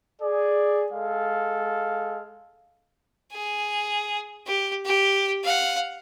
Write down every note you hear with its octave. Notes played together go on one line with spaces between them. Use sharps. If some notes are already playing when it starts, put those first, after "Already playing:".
G#4 D5
G#3 A4 F5
G#4
G4
G4
F5 F#5